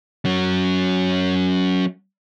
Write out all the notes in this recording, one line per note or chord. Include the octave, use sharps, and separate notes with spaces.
F#3 C#4